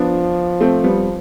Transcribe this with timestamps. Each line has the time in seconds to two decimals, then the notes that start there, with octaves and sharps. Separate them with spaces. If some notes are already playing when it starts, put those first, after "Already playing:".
Already playing: F3 B3 D4
0.60 A3 C4
0.84 G3 B3